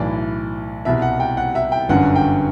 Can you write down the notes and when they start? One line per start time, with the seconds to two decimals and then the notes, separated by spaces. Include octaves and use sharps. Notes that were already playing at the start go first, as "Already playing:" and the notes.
Already playing: B1 A2 E3 D5
0.85 C2 B2 E5
1.02 F#5
1.20 G5
1.37 F#5
1.55 E5
1.72 G5
1.89 G1 F#2 D3 F#5
2.16 G5